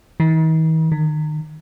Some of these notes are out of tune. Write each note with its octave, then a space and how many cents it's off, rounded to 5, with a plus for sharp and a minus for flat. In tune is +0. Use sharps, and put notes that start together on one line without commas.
D#3 +45
D#3 -30